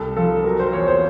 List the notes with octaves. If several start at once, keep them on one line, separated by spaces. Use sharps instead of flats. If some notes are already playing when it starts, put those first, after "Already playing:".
Already playing: C2 A4
F3 A4
F#3 A#4
C5
E2 C#5
C5